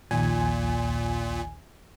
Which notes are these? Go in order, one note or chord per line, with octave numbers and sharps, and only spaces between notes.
A#1 D#2 A#2 G#5